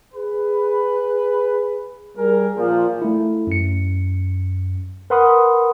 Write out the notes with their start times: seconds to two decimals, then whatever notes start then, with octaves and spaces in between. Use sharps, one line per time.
0.14 G#4 B4
2.17 G3 G#4 A#4
2.57 A#2 F3
3.02 A3 E4
3.47 F#2 C#7
5.10 A#4 B4 F#5 B5 C6 D#6